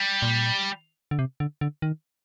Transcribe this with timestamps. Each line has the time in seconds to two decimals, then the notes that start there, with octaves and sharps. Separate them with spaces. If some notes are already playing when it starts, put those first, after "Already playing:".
Already playing: G3
0.22 A#2
1.11 D3
1.19 C3
1.40 D3
1.61 D3
1.82 D#3